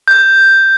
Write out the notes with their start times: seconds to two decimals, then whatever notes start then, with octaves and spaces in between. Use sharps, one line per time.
0.08 G6